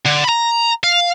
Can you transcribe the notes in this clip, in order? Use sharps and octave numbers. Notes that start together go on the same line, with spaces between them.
D3
A#5 B5
F5